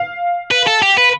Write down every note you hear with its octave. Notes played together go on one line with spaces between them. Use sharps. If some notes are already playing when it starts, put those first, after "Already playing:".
Already playing: F5
B4
A4
G4
B4